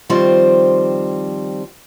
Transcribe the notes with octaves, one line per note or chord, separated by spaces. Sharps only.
D#3 F3 G3 C4 C5